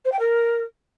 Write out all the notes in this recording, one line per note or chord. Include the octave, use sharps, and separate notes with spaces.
C5
G5
A#4